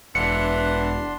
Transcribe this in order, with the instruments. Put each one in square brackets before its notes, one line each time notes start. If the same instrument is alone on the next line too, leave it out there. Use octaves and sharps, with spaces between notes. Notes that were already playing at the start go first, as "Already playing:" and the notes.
[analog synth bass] E1 [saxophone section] E3 F#5 [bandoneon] D4 C6 [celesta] C#7